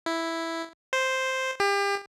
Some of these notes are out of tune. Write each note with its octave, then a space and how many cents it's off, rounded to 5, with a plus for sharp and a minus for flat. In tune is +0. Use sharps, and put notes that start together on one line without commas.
E4 +0
C5 +0
G4 +35